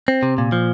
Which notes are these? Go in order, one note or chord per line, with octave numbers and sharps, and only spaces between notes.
C4
C3
A#2
F3